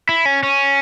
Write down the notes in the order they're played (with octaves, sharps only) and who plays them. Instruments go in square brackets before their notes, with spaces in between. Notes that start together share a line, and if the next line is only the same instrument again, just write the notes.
[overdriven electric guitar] E4
C#4
C#4